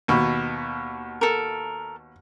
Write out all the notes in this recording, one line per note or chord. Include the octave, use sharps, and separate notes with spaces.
D#2 B2
A4 A#4